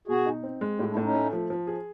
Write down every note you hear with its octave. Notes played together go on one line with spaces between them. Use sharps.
B2 F#4 G#4
D#4
C4
G#3
A2 F4 G4
D4 E4
A2
C#4 D#4
A3
F3
F3
G#4